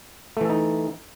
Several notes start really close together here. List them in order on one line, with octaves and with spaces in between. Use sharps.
A3 E3 A4 D#4